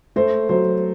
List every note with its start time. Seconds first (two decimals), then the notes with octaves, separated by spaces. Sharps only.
0.16 A3 C5
0.49 F#3 C5